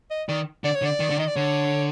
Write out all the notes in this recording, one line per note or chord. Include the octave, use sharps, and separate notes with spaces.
D#5
D#3 D5
D3 D5
C#5
D3
D5
D#3
D3
D#3 D#5
D5
D3 C#5